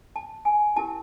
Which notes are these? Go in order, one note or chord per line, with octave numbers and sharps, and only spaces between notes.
A5
G#5
C#4 E4 G4 A#4 A5